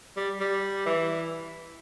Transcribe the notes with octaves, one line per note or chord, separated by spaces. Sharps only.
G3
G3
E3